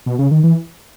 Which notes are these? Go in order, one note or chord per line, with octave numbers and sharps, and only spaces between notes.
B2
C#3
D#3
E3